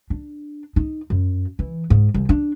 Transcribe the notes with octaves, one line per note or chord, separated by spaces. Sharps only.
D4
D#4
F#2
E3
G#2
C2
D4